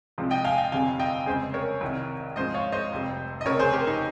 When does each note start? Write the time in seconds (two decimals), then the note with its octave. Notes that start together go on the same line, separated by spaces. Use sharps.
0.18 C2 C3 F3 G#3
0.31 D#5 G5
0.45 F5 G#5
0.58 D#5 G5
0.72 G1 F2 C3 G3 F5 G#5
0.99 D#5 G5
1.26 F1 F2 C#3 G#3 C#4 G#4 C5
1.54 A#4 C#5
1.81 C2 C3 D#3
2.36 G#2 F3 G#3 C#4 C5 D#5
2.54 C#5 F5
2.72 C5 D#5
2.91 F1 F2 C3 G3
3.41 D#5
3.45 F1 F2 C#3 A#4 C#5
3.59 G#4 C5
3.73 G4 A#4
3.87 D#4